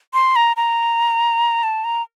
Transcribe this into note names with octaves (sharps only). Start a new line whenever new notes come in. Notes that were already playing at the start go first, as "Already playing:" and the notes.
C6
A#5
A#5
A5
A#5